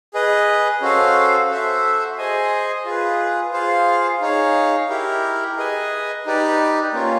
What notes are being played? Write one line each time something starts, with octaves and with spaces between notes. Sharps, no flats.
G#4 B4 D#5
C#4 F#4 A4 C5 F5
F#4 A4 C5 E5
G#4 C5 D#5 G#5
F4 G#4 B4
F4 G#4 C5 F5
D#4 G#4 C#5 F5
E4 G4 A#4
G#4 B4 D#5 G#5
D#4 G4 B4 D5
A#3 C#4 F4